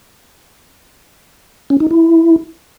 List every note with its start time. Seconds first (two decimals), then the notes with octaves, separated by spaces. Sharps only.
1.70 C#4
1.80 D#4
1.91 E4